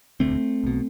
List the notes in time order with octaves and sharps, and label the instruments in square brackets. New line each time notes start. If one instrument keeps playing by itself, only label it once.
[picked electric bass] E1 D2 D3 A3 C4
B1 B2